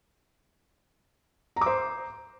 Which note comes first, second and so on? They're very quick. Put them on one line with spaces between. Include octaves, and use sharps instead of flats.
A#5 D6 C5